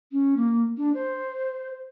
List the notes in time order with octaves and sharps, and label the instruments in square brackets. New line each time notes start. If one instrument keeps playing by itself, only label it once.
[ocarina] C#4
A#3
D4
C5